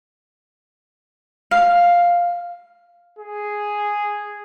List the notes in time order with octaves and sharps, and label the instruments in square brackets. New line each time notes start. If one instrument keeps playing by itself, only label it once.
[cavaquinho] F5
[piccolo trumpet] G#4